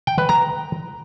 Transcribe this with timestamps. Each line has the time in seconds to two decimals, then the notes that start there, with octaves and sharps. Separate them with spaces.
0.07 G5
0.18 B4
0.29 A#5